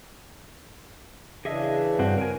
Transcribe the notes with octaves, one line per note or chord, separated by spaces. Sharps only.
C#3 E3 D4 G#4 D#5 E5
G2 C4 F#4
A#4 G#5